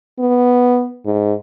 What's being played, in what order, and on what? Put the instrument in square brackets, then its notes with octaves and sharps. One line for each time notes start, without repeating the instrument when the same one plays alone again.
[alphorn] B3
G#2